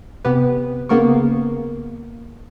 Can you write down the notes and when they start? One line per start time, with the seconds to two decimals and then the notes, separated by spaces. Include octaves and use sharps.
0.25 C3 B3 G4 B4
0.89 C#3 A#3 B3 A#4 C#6